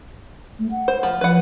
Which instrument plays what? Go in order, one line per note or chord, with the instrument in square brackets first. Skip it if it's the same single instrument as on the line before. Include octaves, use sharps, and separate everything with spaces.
[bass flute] A3
F#5
[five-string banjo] C5
F3
[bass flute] F3 [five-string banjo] B4 F#5